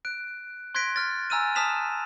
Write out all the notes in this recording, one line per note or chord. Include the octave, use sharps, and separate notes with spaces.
F#6 D7
C6 F#6 G#6 A#6 B6 D7
F6 A6
G#5 A#5 E6 F6 A6 D#7
A5 D#6 F6 B6 E7 F7